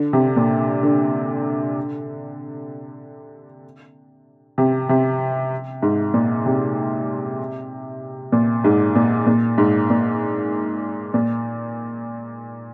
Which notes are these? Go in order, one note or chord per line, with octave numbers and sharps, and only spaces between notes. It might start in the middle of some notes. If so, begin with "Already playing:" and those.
Already playing: D3
C3
A#2
D3
C3
C3
G#2
A#2
C3
A#2
G#2
A#2
A#2
G#2
A#2
A#2